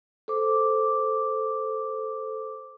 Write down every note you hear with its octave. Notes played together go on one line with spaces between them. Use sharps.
A4 C5 D6